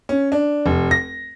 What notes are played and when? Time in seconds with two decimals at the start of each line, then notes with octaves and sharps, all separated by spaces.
0.09 C#4
0.32 D4
0.66 F1
0.91 A#6